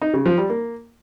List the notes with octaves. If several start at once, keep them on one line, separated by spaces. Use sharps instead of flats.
D#4
C#3
F3
G3
A#3